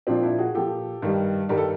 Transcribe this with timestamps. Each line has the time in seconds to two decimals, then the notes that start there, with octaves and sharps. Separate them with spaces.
0.07 A#2 F3 C4 D4
0.23 D4 E4
0.39 F#4 G#4
0.54 A#2 F3 G4 A4
1.02 G2 D#3 G3
1.49 G2 D#3 G3 A#4
1.58 A4